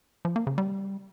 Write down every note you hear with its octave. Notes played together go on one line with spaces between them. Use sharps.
F3
A#3
C#3
G3